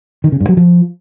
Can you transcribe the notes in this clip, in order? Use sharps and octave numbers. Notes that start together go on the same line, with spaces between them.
D#3
C#3
G2
F#3
F3